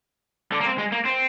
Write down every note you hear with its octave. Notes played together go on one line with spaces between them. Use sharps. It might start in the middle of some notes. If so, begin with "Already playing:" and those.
D3
A#3
C4
G#3
A#3
C4